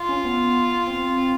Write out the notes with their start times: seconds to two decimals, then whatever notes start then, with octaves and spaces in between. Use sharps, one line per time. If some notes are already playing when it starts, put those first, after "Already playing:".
Already playing: F4
0.09 C#4
0.25 B3
0.87 C4